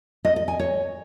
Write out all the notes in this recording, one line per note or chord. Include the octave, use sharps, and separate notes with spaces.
D#5
D#5
G#5
C#5